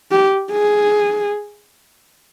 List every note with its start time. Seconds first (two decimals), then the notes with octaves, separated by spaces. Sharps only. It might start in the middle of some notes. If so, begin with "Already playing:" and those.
0.11 G4
0.52 G#4